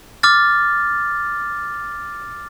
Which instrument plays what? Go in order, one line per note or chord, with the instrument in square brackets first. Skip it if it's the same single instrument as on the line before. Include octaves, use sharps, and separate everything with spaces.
[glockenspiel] D6 F6 A6